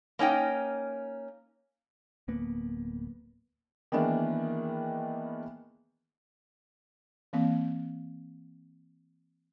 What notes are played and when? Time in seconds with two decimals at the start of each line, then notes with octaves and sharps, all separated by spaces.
0.19 A#3 C#4 D#4 G5
2.28 D1 A#3 B3
3.92 D#3 E3 G#3 A#3 B3 D4
7.33 E3 A#3 C4 F5